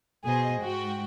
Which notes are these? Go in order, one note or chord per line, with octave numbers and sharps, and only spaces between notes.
B2 G#4 C5 D#5
G#2 F#4 G5